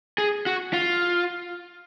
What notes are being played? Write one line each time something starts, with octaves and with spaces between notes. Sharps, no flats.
G#4
F#4
F4